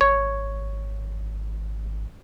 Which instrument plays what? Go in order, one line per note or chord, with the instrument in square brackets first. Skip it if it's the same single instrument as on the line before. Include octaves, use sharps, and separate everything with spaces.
[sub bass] G#1 [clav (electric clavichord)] C#5